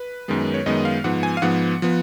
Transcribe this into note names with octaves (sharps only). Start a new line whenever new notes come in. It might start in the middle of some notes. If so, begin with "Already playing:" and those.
Already playing: B4
F#2 D#3 G#3 B3
C#5
F#2 D#3 G#3 B3 D#5
F5
G#2 F3 B3 F#5
G#5
F5
G#2 F3 B3 F#5
F3 B3